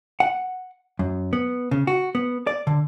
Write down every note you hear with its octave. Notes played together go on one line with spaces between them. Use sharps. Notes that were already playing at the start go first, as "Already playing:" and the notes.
F#5
F#2
B3
C#3
F#4
B3
D5
D3